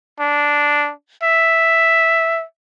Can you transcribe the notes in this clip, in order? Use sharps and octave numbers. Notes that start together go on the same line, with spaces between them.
D4
E5